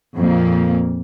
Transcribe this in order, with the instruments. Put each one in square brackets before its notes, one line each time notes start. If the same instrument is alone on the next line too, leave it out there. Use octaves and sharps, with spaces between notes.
[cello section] F2 A#2 A#3